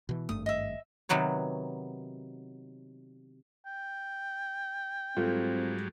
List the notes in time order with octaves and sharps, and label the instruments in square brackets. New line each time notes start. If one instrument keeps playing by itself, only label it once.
[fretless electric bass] B2 E3
[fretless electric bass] G#1 G2 A3 [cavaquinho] D#6
[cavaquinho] D#5 E5
[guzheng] C3 D#3 F#3 B3 C#5
[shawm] G5
[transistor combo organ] G#2 F#3 G3 [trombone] C4 [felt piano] F4 A4